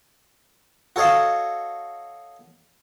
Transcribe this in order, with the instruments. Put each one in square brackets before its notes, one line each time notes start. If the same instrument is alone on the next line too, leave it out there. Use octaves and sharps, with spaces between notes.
[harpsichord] F#4 A4 C#5 D#5 F5